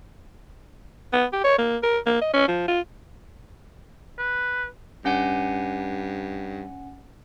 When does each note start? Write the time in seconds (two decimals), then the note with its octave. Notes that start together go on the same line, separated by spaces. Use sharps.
1.13 B3
1.33 G4
1.44 C#5
1.58 A#3
1.83 A#4
2.06 A#3
2.22 D#5
2.34 C#4
2.48 F3
2.68 F4
4.18 B4
5.05 G2 C#4 F#5 G#5